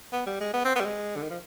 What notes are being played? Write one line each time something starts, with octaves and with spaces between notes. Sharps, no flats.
B3
G3
G#3
B3
C4
B3
G3
G#3
D3
D#3
F3